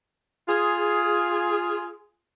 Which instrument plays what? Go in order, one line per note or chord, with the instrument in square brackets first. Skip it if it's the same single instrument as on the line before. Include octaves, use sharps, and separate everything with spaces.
[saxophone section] F4 G#4